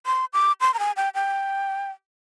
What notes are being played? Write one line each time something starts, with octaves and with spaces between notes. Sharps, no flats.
C6
D6
C6
A#5
G#5
G5
G5